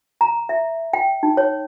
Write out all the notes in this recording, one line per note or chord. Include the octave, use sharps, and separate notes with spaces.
A#5
E5
G5
D#4
C#5